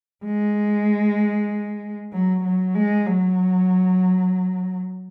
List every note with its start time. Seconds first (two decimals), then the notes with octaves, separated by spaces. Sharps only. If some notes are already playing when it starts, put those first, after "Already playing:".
0.25 G#3
2.13 F#3
2.44 F#3
2.75 G#3
3.06 F#3